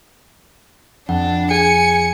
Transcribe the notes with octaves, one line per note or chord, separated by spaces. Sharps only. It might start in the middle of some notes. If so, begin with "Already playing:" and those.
F2 D4 F#5
G#4 G#5 C#7